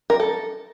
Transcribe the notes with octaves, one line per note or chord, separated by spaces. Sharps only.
A#4
A4